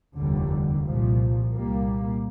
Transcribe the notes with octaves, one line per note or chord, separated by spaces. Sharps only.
F1 D#2 D3 G3
C2 A#2 F3
C2 A#2 G3 A#3